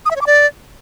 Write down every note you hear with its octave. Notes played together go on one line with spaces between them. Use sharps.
D#6
E5
C#5
D6
D5